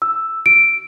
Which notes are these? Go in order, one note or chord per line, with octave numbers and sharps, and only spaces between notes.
E6
D7